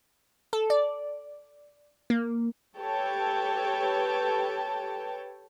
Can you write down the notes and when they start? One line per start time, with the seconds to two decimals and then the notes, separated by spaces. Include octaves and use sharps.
0.53 A4
0.70 D5
2.10 A#3
2.76 G4 A4 B4 C#5 G5 A5